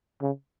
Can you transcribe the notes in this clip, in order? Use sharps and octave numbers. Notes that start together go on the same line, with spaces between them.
C#3